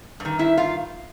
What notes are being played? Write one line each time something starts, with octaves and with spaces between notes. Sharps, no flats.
G2
D#3
E4 E5
F4 F5